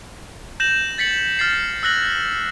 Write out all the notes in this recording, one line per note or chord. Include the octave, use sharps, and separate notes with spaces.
G6 A#6 E7 F#7
A6 B6 C#7 F#7
F6 A6 C7
E6 F#6 A#6 F#7